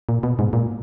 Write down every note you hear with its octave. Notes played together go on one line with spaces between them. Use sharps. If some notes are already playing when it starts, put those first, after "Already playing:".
A#2
B2
G#2
A#2